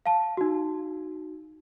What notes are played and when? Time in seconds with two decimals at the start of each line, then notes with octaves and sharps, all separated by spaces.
0.06 F5 A5
0.37 D#4 F#4